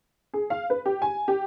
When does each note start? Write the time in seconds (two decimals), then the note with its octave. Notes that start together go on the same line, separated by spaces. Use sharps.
0.34 G#4
0.50 F5
0.70 B4
0.86 G4
1.02 G#5
1.28 G4